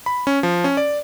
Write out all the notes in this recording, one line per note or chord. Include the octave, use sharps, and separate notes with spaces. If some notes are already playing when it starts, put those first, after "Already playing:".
B5
C#4
F3
C#4
D5